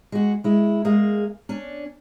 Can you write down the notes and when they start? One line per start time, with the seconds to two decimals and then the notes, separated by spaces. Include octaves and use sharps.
0.12 G#3 F#4
0.44 G#3 E4
0.85 G#3 A#3 G#4
1.49 C#4 D4